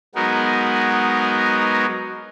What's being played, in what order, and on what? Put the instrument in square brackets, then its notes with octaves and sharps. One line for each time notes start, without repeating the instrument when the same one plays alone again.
[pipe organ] F#3 G#3 B3 D#4 F#4 A#4